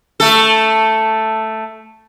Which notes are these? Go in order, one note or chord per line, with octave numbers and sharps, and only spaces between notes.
A3 A4